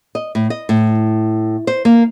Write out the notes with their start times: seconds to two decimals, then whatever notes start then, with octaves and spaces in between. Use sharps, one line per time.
0.15 D#5
0.35 A2
0.50 D#5
0.69 A2
1.67 C5
1.85 A#3